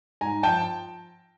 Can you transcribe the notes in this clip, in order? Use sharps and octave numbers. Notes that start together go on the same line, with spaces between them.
G#2 G#5 A#5
F3 G5 A5